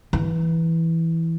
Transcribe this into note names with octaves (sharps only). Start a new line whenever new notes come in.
E3